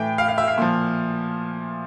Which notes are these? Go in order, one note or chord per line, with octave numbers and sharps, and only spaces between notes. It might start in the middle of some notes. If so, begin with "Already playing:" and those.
Already playing: A2 E3 G5
F5
F5
E5
F5
A#2 F3